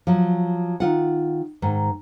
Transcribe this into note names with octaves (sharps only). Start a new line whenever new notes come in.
F3 F#3
D#3 F4 F#5
G#2 D#3